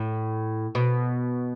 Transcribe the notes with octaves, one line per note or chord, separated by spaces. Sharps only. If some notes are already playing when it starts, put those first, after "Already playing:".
Already playing: A2
B2